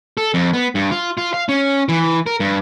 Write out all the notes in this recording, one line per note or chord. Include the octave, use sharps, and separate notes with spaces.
A4
F2
B3
G2
F4
F4
F5
C#4
E3
A#4
G2